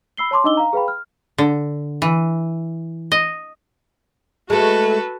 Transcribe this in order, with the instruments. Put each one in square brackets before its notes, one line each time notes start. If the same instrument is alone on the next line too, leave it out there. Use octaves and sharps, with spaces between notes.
[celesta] B5 E6 C7 G7
C#5 A5 C6 D6
D4 D#4 D#5 D6 E6 G7
F5 A#5
G#4 B4 F5 G5 B5
F6
[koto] D3
E3
D#5
[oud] G#3 A3 [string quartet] F#4 A4 B4